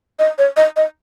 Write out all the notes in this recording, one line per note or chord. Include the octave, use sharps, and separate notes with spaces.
D#5
C#5
D#5
D#5